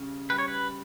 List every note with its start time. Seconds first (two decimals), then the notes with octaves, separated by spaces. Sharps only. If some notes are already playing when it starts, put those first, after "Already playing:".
Already playing: C#3 G3 C#4
0.30 G3 B4
0.38 C#5
0.48 B4